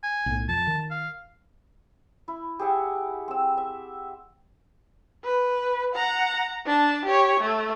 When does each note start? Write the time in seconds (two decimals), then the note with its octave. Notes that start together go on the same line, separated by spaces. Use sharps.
0.03 G#5
0.26 B1 A2
0.49 F2 A5
0.67 D#3
0.91 F5
2.28 E4
2.59 G4 G#4 E5 F#5
3.28 C4 E6
3.57 E5
5.24 B4
5.95 F#5 A#5
6.66 D4 A5
7.05 G4 C#5
7.40 A3